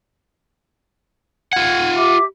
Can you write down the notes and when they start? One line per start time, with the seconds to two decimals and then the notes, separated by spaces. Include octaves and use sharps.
1.53 F4 F#5 G#6
1.96 G4 E5 D6